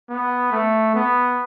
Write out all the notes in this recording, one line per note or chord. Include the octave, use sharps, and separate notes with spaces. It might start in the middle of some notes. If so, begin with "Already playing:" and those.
B3
A3
B3